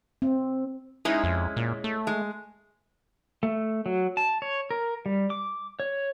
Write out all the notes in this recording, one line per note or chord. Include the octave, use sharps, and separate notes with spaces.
C4
G#3 C#4 D#4 E4
F2
A#2
A3
G#3
A3
F#3
A5
C#5
A#4
G3
D6
C#5